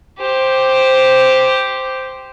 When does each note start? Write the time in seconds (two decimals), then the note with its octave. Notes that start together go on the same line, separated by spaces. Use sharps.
0.19 G4 C5